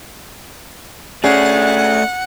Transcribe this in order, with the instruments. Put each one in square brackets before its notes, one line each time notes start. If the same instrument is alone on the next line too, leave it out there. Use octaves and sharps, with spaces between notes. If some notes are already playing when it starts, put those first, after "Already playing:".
[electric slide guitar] A3 D5 [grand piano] C#4 G#4 [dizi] F#5